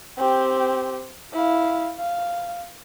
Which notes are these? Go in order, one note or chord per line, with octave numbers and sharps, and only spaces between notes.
C4 G4
E4 F5
F5